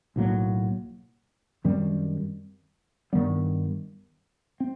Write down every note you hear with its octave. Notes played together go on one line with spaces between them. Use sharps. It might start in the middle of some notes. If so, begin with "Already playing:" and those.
B1 A2 F#3 A#3
F#2 D#3 G3 C4
G2 D#3 G3 B3
C4